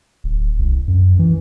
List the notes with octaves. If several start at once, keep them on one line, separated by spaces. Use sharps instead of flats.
D1
C2
F#2
E3